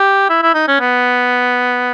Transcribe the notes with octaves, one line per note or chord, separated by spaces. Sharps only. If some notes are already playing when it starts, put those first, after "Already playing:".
Already playing: G4
E4
E4
D#4
C#4
B3